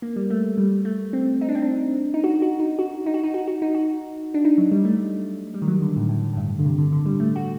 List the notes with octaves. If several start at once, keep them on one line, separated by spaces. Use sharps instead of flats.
A#3
G3
A3
G3
A3
C4
D#4
D4
C4
D4
D#4
F#4
F#4
D#4
F#4
D#4
F#4
D#4
F#4
F#4
D#4
F#4
D4
D#4
F#3
G3
A3
G3
D#3
F#3
D3
A2
A2
A2
G2
D3
C3
D3
D3
G3
A3
F#4